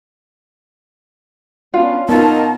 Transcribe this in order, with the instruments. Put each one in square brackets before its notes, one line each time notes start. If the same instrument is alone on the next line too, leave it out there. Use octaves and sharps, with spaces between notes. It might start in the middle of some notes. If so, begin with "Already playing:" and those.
[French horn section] B3 C#4 D4 [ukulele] F4 F5
[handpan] B3 [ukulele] C#4 F4 [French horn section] D#4 A#4 [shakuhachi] A5